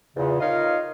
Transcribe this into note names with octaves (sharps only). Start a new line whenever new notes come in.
E2 A#2 C#3
D#4 F4 A#4 C#5 D#5 F5